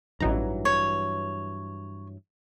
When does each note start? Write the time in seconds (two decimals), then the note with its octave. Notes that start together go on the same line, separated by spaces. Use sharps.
0.20 A1 G2 E3 F#3 D#4 A#5
0.65 C#5